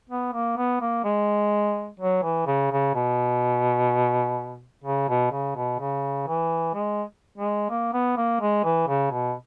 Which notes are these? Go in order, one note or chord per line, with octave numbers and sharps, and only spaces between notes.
B3
A#3
B3
A#3
G#3
F#3
E3
C#3
C#3
B2
C#3
B2
C#3
B2
C#3
E3
G#3
G#3
A#3
B3
A#3
G#3
E3
C#3
B2